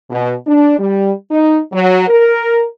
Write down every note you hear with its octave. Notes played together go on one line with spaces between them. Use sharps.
B2
D4
G3
D#4
F#3
A#4